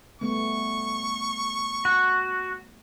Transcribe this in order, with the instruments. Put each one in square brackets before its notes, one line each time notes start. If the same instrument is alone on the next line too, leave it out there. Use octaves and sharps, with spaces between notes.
[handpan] G3 A3 B3 [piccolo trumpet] C#6
[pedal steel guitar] F#4